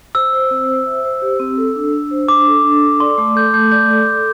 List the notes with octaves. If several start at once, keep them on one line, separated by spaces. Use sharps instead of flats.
C5 E6
C5
C4
C5
E5
C5
G4
C4
A4
D4
D4
C5
D4 D6
A4
D4
A4
D5 C6
A3 D6
A4 G6
A3 G6
D5 G6
A4
A4